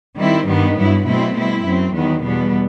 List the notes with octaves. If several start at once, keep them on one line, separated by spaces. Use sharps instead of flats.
D#3 G3 C4 E4
G2 D#3 G3 B3
G2 F#3 B3 E4
B2 F#3 A3 C4 E4
B2 G3 C4 E4
F#2 F#3 C4
E2 D#3 F#3 B3
E2 B2 G3 B3